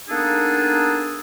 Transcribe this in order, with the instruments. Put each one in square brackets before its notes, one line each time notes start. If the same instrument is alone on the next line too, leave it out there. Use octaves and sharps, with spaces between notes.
[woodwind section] A#3 B3 D4 D#4 G#4 A4